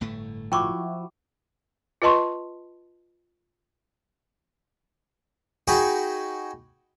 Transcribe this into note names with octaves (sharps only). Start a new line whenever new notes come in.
G1 A2 A3
F3 E4 F#4 G5 C#6 D6
F4 B4 D#5 A5 C6 C#6
D#4 F#4 G#4 F#5 G5 B5